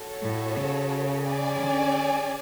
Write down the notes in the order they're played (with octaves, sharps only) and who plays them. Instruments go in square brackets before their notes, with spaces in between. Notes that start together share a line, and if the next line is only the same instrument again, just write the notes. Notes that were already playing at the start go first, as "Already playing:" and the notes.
Already playing: [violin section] F#4 A4 C#5
[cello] A2
C#3
[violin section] C#4 G#4 D5 G#5
[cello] D3